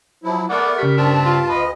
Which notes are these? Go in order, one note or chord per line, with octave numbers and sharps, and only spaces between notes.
F3 F#3 E4
A3 B3 G#4 A#4 D5 F#5 D6
C#3 G3 C#6 B6
G2 C4 D4 A5
F4
D2 B4 D#5